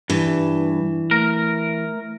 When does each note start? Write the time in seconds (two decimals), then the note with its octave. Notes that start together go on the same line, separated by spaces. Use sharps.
0.10 G2 E3
1.11 A3 A#4